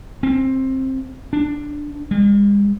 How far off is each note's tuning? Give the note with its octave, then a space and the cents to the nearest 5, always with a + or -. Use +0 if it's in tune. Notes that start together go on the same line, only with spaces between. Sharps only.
C4 +15
D4 +5
G#3 -45